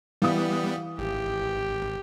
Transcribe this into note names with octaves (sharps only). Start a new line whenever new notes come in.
E3 G3 B3 F5 D#6
G#1 G4